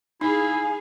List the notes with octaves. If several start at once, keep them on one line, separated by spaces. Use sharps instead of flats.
D#4 E4 G#4 F5 G#5